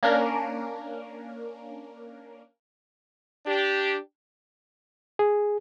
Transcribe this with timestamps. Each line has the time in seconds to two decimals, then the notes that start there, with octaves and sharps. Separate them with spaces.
0.03 A#3 C#4 D4 A#4
3.46 D4 G4
5.19 G#4